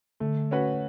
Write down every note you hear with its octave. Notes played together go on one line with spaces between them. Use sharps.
D3 A3
C#4 F#4 B4